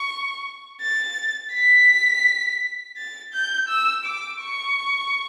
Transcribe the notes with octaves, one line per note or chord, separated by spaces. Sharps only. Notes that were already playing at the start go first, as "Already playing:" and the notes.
Already playing: C#6
A6
B6
A6
G6
E6
D6
C#6